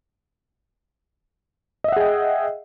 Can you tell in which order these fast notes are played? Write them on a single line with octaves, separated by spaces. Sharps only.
D#5 E5 F#5 G#4 G5